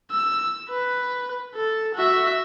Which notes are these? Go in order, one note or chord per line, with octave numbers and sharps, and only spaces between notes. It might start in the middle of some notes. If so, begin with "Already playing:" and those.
E6
B4
A4
F#4 E5